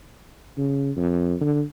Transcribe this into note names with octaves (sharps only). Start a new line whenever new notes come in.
C#3
F2
D3